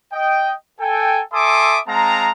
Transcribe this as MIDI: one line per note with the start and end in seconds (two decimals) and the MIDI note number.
0.13 0.54 75
0.13 0.54 79
0.80 1.22 69
0.80 1.22 79
0.80 1.22 80
1.33 1.79 69
1.33 1.79 76
1.33 1.79 80
1.33 1.79 84
1.33 1.79 86
1.33 1.79 87
1.87 2.32 56
1.87 2.32 60
1.87 2.32 77
1.87 2.32 81
1.87 2.32 82